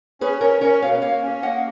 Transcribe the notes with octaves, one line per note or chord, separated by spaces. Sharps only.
C#4 G#4 B4
C#4 A#4 C#5
C#4 A#4 C#5
B2 C#5 F5
A#3 C#5 F5
C#4
A#3 D#5 F#5